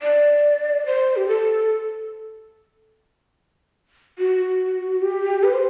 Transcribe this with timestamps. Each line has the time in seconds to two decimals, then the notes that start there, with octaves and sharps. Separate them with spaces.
0.02 D5
0.86 C5
1.16 G4
1.27 A4
4.19 F#4
5.02 G4
5.44 B4
5.54 C5